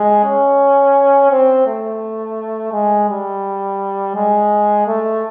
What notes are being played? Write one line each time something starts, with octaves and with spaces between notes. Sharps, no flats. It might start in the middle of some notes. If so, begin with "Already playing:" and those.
Already playing: G#3
C#4
C4
A3
G#3
G3
G#3
A3